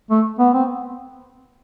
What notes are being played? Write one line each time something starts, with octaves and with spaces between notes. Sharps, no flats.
A3
B3
C4